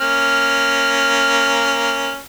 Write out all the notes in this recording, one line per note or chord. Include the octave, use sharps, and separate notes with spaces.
A#3 C#4 F6